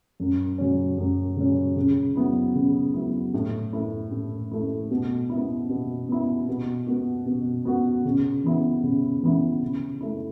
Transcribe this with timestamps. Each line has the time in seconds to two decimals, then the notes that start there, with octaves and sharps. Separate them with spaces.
0.20 F#2
0.58 C#3 F#3 C#4
0.98 F#2
1.37 C#3 F#3 C#4
1.76 C#3
2.16 F#3 B3 E4
2.55 C#3
2.94 F#3 B3 E4
3.34 A2
3.73 A3 E4
4.12 A2
4.52 A3 E4
4.91 B2
5.30 E4
5.35 B3
5.69 B2
6.09 B3 E4
6.48 B2
6.87 B3 F#4
7.26 B2
7.65 B3 F#4
8.05 C#3
8.44 E3 B3 E4
8.84 C#3
9.23 E3 B3 E4
9.62 C#3
10.01 A3 E4